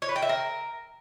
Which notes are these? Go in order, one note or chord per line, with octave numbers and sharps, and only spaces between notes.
C#5
B4
G5
E5
A#4